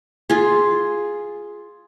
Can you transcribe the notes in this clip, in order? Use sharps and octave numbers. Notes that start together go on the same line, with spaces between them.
F4 G#4